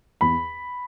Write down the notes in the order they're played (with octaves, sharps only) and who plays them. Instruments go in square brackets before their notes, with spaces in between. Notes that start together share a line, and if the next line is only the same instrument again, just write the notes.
[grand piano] E2 B5